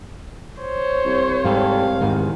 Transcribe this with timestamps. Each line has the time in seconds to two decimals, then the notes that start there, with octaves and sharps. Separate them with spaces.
0.60 C5 C#5
1.05 C2
1.45 G#2 G3 A4 F5
2.01 E2 G#2 D#3